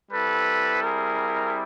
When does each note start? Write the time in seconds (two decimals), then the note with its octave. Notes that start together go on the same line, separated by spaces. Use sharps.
0.11 G3 C4 E4 A4 B4
0.83 G#4 A#4